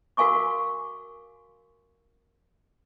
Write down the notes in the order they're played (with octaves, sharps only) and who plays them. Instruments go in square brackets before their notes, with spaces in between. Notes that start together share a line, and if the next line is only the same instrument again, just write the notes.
[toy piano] F#4 A#4 F5 G#5 C#6 D6